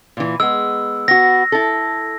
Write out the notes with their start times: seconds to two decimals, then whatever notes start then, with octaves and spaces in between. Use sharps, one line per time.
0.17 A#2 E3
0.40 G#3 B3 E6
1.08 B3 F#4 A#6
1.52 E4 A4